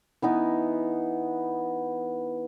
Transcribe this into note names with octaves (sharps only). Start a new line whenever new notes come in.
E3 B3 D#4 E4